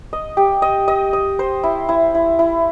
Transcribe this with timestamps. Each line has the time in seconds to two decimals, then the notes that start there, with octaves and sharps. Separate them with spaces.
0.13 D#5
0.37 G4
0.62 D#5
0.88 D#5
1.13 D#5
1.39 C5
1.64 E4
1.89 E4
2.15 E4
2.39 E4